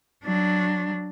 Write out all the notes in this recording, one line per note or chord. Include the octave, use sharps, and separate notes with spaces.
F#3 D4